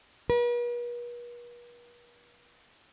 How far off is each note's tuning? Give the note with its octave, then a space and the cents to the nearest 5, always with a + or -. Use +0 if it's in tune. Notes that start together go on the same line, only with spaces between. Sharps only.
B4 -45